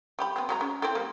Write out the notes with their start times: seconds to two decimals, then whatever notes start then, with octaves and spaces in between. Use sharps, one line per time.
0.19 G3 G4 B5
0.36 B3 C4
0.49 F#3 G#3 A#5
0.61 C#4
0.82 C4 E4 A4
0.95 G3 A#3